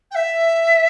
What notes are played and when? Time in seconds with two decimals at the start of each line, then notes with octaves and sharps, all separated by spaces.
0.11 G5
0.15 E5